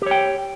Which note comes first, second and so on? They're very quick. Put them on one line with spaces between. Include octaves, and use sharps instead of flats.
G4 C#5 G5